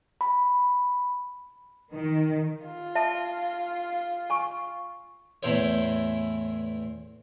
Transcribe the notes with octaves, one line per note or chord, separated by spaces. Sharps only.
B5
D#3
F4
E5 A5
G#5 C#6
E2 A2 E4 C5 C#5